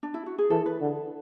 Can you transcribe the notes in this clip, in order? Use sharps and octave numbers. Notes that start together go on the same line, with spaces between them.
D4
E4
F#4
G#4
E3 A4
B4
D3